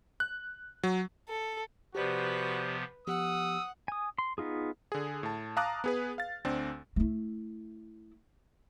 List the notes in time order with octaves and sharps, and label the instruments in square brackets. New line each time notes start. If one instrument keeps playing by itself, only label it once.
[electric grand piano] F#6
F#3
[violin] A4
[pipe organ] C3 F3 B3 [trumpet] F#4 [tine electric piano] G4 C5 D5 [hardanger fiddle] B4
[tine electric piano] F3 B3 G4 [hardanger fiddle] F#5 [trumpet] D#6 [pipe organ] E6
[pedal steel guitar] G#5 D#6
C6
B3 D#4 F4 G#4
[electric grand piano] D3 G#4
A2 A5
F5 A5 A#5 D6 D#6 F#6
B3 G#4 B4
F5 A6
D2 C4 D4
[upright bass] A3 E4